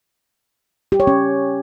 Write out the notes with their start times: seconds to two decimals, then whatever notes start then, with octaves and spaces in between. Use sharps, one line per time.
0.92 G4
1.00 C#5
1.07 C#4